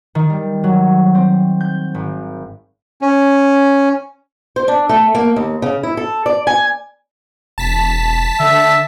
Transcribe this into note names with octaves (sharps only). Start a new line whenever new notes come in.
D#3
G3
F#3
C4
G6
G#1
C#4
C5
D4
A3
A#3
D#2
C#3
E4
A4
D5
G#5
E1 A5 B6
D3 E5